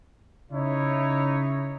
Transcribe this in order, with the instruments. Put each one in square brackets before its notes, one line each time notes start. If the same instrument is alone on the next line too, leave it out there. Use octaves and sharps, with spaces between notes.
[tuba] C#3 [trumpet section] D#4 E4 C#5